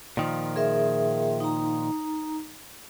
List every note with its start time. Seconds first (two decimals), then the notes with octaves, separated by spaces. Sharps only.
0.17 A#2 D#3 F3
0.56 G#4 A#4 E5
1.40 D#4 A#5